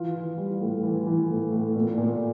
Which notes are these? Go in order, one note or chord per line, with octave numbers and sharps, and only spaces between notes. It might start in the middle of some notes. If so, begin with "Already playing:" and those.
Already playing: E3 F4 F5
E3
G3
A2
E3
E3
A2
A2
A#2
A#2